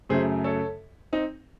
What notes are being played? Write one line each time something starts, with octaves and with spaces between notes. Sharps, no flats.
F#2 C#3 F#3 A3 G#4 C5
A4 C#5
C4 D#4